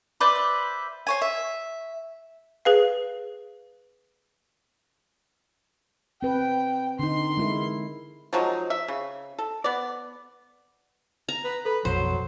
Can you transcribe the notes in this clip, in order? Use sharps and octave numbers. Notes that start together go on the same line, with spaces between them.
B4 C5 D5 E5
C5 C#5 G#5
E5
G#4 B4 F5
C4 B4 G5
D3 D#4 C6
G#3 E4 A#4
F3 F#3 G#3 D#4
E5
C#3
A4
B3 D5
A#5
B4
A4 B4 B5
A#1 F2 B2 F#3 C5